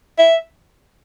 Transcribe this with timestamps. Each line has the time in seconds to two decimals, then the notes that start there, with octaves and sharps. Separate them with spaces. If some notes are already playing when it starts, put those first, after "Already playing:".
0.19 E5